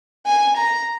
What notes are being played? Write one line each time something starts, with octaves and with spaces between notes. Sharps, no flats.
G#5
A#5